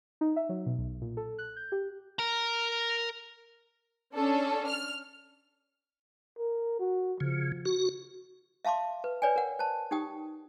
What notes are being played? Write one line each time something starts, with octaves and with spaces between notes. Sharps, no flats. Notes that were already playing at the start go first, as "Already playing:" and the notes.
D#4
E5
F#3
B2
B1
A#2
A4
F#6
G6
G4
A#4 A#5
C#4 D4 A4
F6
A#4
F#4
C#3 F3
F#4
E5 F5 A5 C6 D6
B4
B4 C#5 D5 G5 G#5
A#4 F#5
C5 A5
D#4 G4 G5 D#6